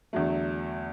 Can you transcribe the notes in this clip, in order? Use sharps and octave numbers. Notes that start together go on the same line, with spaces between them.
E2 D3 F#3 A3